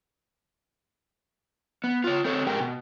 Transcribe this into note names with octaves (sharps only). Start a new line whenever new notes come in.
B3
F4 C#5
C4 A4 C#5
G#2 G4 A#4 G5
B2